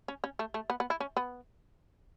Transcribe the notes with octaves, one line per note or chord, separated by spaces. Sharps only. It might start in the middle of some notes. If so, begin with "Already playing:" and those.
C#4
C#4
A3
A3
B3
B3
E4
C#4
B3